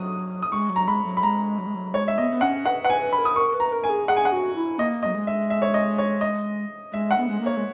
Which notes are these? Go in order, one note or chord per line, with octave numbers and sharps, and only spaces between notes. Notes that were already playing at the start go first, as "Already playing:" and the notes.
Already playing: F#3 D#6
D#6
G#3 C#6
F#3
A#5
G#3 B5
F#3
B5
G#3 A#5
F#3
G#3
F#3
G#3 C#5
E5
B3 D#5
B3
C#4 F#5
B4 F#5
B4 F#5
G#5
B4
B5
A#4
D#6
A#4 C#6
B4
A#5
A#4
G#5
G#4
G#4 F#5
G#5
F#5
F#4
E4
A#3 D#5
D#5
F#3
G#3
E5
E5
C#5
D#5
C#5
D#5
G#3 E5
F#5
B3
G#3
A#3
C#5
G#3